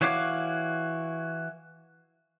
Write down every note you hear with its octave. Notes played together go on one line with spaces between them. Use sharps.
E3 F#4 C#5 F5 D6